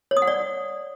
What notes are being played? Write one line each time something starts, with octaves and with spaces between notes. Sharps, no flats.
C#5
D#6
F#5
D5